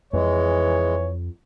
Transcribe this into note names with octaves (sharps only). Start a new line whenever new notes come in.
F2 E3 G#3 C#5